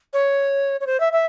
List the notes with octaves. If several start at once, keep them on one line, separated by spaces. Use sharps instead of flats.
C#5
C#5
C5
E5
E5